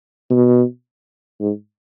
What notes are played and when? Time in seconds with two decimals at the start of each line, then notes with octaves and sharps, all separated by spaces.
0.30 B2
1.40 G#2